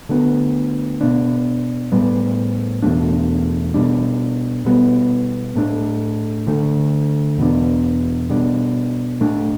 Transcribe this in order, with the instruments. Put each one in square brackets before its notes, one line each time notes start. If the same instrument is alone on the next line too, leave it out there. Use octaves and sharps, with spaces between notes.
[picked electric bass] D2 D3 B3
B2 B3 D4
A2 G3 B3
E2 B2 A3 D4
B2 G3 D4
B2 G3 B3
A2 A3 D4
D2 D3 A3
E2 B2 B3 D4
B2 G3 D4
A2 A3 D4